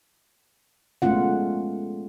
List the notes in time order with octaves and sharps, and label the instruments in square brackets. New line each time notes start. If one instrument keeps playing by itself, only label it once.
[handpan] G#3 A3 B3 C#4 F4 F#5